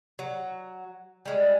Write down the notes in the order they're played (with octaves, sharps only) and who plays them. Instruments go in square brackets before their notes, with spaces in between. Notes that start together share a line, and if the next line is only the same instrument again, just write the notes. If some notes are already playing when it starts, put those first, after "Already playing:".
[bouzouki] F#3
G3 G#3